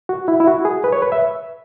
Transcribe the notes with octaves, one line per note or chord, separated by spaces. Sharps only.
F#4
E4
E4
F#4
G#4
B4
C#5
B4
E5